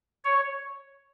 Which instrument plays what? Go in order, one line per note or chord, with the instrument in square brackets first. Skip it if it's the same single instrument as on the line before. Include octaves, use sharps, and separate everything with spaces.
[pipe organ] C#5